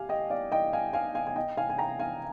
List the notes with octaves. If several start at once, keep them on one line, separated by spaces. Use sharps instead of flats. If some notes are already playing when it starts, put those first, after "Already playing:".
Already playing: G4 F5 G#5
D#5 G5
D5 F5
D#5 G5
F5 G#5
F5 G#5
F5 G#5
G#5
D#5 G5
F5 G#5
G#5
G5 A#5
F5 G#5